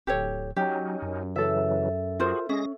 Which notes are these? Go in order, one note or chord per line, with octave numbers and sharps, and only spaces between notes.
D1 G4 A4 C#5
F#3 C#4 D#4 G4
F#2
C#3 E3 F#3 A4 E5
F4 F#4 G#4 A#4 C5
G#3 C#4 G#4 A#6